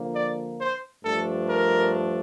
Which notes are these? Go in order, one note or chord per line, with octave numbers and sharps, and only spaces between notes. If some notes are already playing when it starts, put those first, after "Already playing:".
Already playing: D3 F3 A#3 D4
D5
C5
G2 F3 A3 D4 A4
A#4